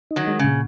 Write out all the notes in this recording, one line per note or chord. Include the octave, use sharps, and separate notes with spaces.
D#4
D#3 F#3
G#3
A#2 C#3